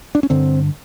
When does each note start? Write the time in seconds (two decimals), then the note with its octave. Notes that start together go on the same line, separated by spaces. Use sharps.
0.15 D4
0.23 C#4
0.30 G2 D3 C4